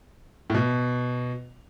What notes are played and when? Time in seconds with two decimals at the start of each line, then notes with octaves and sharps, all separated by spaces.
0.50 A2
0.54 B2